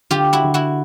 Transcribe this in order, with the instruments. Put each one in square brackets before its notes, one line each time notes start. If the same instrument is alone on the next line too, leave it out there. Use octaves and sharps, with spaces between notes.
[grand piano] D3 [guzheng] F4 G4
[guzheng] E4 F#4
[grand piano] D3
[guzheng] E4 F#4